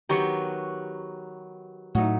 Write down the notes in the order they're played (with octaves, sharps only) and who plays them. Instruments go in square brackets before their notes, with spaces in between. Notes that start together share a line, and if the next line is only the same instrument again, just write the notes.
[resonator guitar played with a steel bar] D#3 F#3 B3 [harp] G4 C#6
[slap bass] A2 A3 [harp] F#3 D#4